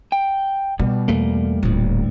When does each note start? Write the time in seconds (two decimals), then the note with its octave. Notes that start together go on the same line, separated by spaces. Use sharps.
0.12 G5
0.79 B2 G3
1.08 E2 A3 A#3
1.63 D#1 D2 A2